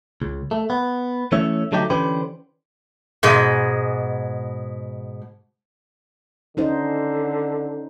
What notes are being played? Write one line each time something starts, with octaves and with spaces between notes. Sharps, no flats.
C#2
A3
B3
E3 A3 C#4 C#5 E5
D3 F#3 A3 D#4 G4
D3 E3 C#4 G4 B4 C5
G#2 B2 G#3
D3 C#4 D#4 C5